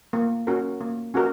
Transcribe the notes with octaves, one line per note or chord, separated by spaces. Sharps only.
A#3
C#4 F#4 A#4
A#3
C#4 F#4 A#4